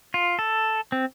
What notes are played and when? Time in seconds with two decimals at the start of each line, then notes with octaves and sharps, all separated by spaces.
0.14 F4
0.39 A4
0.92 C4